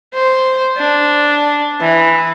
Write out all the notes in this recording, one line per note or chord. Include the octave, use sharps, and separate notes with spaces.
C5
D4
E3